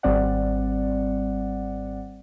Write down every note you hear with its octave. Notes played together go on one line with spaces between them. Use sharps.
G#1 G3 C4 D5 F#5